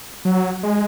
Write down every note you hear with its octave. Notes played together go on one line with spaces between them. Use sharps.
F#3
G#3